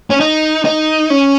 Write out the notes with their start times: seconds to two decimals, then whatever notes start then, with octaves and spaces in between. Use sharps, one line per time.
0.10 C#4
0.20 D#4
0.65 D#4
1.10 C#4